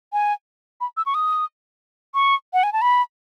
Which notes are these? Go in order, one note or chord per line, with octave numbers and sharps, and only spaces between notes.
G#5
B5
E6
C#6
D#6
C#6
F#5
G#5
A5
B5